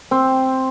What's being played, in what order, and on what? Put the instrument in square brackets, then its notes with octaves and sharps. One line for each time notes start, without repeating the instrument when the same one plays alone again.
[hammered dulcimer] C4